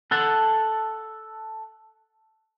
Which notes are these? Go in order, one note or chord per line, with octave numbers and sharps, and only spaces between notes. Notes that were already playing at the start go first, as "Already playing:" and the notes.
A4 F#5 A5